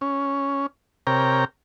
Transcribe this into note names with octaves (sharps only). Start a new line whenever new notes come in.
C#4
C3 A#4 C#5 G5 A#5